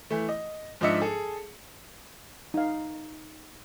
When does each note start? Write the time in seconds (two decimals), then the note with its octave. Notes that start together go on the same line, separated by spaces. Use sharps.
0.10 E3 A3
0.29 D#5
0.81 G#2 F3 D4 D#5 E5 C#7
1.01 G#4 A4
2.54 D#4 F5